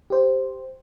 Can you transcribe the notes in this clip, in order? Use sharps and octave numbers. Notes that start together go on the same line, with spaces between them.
G4 C5